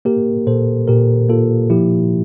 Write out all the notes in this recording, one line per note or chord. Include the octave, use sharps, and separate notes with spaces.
A#3 G4 A#4
A#2 A4 C5
A#2 G4 A#4
A#3 F4 A4
F3 E4 G4